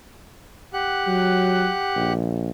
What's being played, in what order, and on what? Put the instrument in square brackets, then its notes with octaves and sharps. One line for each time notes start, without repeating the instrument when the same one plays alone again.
[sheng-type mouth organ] G4 F#5 F#6
[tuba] F#3
A#1